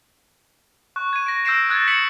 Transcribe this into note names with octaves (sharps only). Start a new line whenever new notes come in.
C#6 F#6
G#6 D#7
A#6 D7
E6 G6 A#6 C7 D7 E7
D#6 F#6 G#6 A6 C#7
D#6 A#6 B6 C#7 E7 F#7